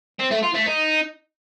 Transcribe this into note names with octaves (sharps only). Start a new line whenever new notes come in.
C4
A3
F4
A3
D#4